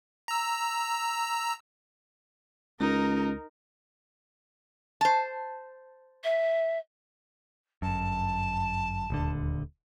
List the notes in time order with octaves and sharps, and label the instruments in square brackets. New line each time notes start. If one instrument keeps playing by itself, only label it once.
[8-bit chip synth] A#5 E6
[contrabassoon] C#2 [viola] D#4 A#4
[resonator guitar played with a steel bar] C5 A5
[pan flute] E5
[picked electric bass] G1 F#2 [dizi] A5
[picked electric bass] D#1 D2 D3